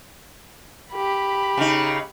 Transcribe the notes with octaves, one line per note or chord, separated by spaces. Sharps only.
G4 B5
C#3 D#4